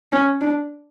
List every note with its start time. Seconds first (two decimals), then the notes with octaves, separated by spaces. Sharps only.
0.12 C#4
0.41 D4